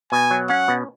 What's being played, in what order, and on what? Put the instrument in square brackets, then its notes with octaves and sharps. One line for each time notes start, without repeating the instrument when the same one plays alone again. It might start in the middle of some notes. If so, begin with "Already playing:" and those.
[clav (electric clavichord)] B2 [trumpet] G#5
[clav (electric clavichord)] F#3
[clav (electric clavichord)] C#4 [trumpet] F#5
[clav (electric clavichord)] B2